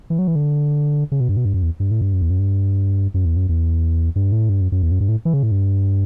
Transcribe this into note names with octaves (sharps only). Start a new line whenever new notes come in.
E3
F#3
E3
D3
C#3
B2
G2
B2
G2
F#2
E2
G2
A2
G2
F#2
E2
F#2
G2
F#2
E2
F#2
E2
G2
A2
G2
F#2
F#2
E2
F#2
G2
A2
E3
C#3
A2
G2